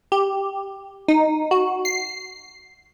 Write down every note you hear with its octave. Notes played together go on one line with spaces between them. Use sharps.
G4
D#4
F#4
C7